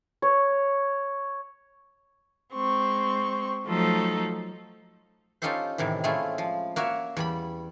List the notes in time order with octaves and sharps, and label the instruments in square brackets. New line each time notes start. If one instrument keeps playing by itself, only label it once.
[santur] C#5
[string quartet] G#3 C4 C#6
F3 F#3 A3 D#4 A4
[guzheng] C#4 D#4 F4 G4 A4 C5
A2 C3 D#3 E3
G#3 A3 C4 C#4 E4 F4
F3
A#3 F#4 C#5 E5
E2 G3 B5